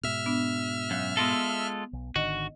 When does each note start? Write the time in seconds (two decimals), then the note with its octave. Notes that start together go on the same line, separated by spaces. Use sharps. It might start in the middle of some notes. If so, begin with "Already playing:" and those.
0.04 G#2 B2 E5 F6
0.26 B3 D4
0.91 F#2 F5 F#6
1.17 G#3 B3 F4 A4 A#6
1.93 B1
2.16 G#1 D3 D#3 F#4 D#5